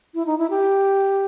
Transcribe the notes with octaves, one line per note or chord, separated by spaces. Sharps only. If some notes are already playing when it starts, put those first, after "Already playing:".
E4
D#4
E4
G4